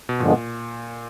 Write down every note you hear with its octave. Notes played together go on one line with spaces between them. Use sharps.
B2
G2 A#2 D3 F3 G#3 B3